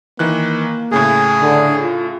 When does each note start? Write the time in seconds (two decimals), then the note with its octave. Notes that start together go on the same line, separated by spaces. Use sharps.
0.19 D#3 E3 A#3 F#6
0.91 A2 C#3 A3 G#4
1.42 D3
1.81 F4